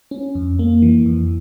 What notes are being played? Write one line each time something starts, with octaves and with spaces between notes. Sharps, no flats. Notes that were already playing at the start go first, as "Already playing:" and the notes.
C#4
F2
A#3
E3
F2